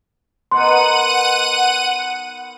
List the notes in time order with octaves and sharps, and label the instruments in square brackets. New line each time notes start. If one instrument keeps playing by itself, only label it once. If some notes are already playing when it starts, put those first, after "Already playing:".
[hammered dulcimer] B3 D#4 A#4 [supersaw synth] F#5 D#7 [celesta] C6